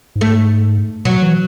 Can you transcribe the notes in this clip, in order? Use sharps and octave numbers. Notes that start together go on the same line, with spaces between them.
G#2
A3
B2 F#3
E3